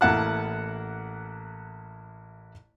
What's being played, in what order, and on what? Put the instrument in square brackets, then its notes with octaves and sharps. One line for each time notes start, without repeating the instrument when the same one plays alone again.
[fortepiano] A1 A#3 E4 F#5 A5 F#6